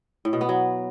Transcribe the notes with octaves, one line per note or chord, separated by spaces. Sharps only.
A2
B2
B3
F#3